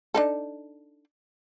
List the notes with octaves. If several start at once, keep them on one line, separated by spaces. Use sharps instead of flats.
D4 D#4 A4